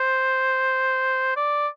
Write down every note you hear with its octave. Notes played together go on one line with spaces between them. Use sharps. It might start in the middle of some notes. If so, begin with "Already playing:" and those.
Already playing: C5
D5